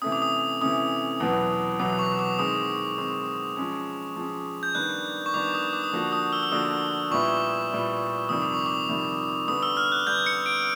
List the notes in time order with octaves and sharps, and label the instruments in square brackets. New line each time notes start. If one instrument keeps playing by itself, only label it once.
[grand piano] C3 E3 A3 C#4 [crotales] D#6
[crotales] D6
D#6
[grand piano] C3 E3 A3 C#4 [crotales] D#6
[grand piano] E2 B2 F#3 B3
[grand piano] E2 B2 F#3 B3 [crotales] D6
[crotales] C#6
D6
[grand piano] D#3 G#3 C4 [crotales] D#6
[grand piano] D#3 G#3 C4
F3 G#3 C#4
F3 G#3 C#4
[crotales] G6
[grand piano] D#3 G3 B3 D4 [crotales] F#6
[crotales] C#6
[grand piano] D#3 G3 B3 D4 [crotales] D6
[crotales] D#6
D6
D#6
[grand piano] D3 F3 A#3 D4 F#4 [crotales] D6
[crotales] D#6
E6
E6
[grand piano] D3 F3 A#3 D4 F#4 [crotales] D#6
[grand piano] A#2 G3 B3 E4 [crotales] C#6
[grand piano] A#2 G3 B3 E4
[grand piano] F2 C3 D#3 G3 [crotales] D#6
[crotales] D6
C#6
D6
[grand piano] F2 C3 D#3 G3
[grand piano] D3 G3 B3 [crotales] D#6
[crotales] E6
F6
F#6
[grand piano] D3 G3 B3 [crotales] G6
[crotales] C#7
D7